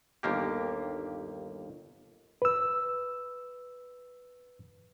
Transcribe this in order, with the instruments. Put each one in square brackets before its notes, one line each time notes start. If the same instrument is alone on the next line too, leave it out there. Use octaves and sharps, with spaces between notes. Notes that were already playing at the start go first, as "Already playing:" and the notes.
[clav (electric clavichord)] G1 D#2 A#3 G4
[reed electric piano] B4 E6